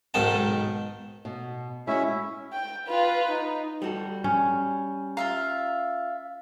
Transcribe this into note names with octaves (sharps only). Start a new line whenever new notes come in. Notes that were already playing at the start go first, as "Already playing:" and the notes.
B1 G#2 D#3 D#4 A5
B2
G#3 C#4 E4 F#4 E5
G5
F4 B4
D#4
G3 F#4 A4
C#4
F4 E5 F5 A#5